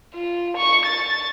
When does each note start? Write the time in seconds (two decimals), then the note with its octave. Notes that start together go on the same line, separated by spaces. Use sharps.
0.14 F4
0.57 C#6
0.86 A6